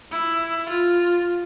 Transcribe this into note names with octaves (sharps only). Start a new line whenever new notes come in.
E4
F4